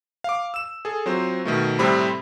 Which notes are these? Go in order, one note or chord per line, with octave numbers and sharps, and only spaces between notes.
F5 D6
E6 E7
G#4 A4
F#3 C4 F4 C5
B2 D#3 A3
A2 C3 G3 C4 G4 B5